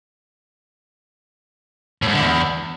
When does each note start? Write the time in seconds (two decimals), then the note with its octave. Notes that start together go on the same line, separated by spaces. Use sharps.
2.02 A2
2.08 G#2
2.13 D3
2.19 E2